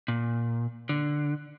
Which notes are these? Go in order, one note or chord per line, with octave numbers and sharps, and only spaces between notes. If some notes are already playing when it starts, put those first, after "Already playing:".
A#2
D3